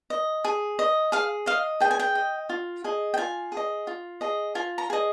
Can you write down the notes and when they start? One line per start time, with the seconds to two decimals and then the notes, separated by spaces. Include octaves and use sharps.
0.10 D#5
0.45 G#4
0.79 D#5
1.12 G#4 F5
1.46 D#5 F5
1.80 G#4 G5
1.91 G#5
1.99 G5
2.15 D#5
2.49 F4
2.84 G#4 D#5
3.14 G5
3.17 F4 G#5
3.52 G#4
3.57 D#5
3.87 F4
4.21 G#4 D#5
4.55 F4 G#5
4.78 A#5
4.90 G#4 D#5